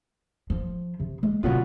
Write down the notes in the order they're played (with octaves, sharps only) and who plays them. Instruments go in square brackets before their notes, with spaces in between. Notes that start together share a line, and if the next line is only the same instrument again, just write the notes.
[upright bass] F3
C3
G#3
[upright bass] B2 C#4 [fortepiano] F#3 B3 F4